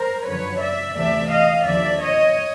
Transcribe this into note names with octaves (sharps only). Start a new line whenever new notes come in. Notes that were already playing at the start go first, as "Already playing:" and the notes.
Already playing: A#4 C5
F#2 D3 F3 B4 C#5
D5 E5
D2 C3 E3 A3 D5 E5
D#5 F5
D#2 D3 F3 D5 E5
C#5 D#5